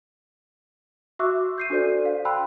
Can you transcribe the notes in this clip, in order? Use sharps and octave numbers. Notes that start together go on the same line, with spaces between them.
F#4 E5 C#6 D6 E6 F#6
G6 C7 D#7
D4 F#4 A4 C5 D5 G6
F5
G5 A5 B5 C6 E6 F#6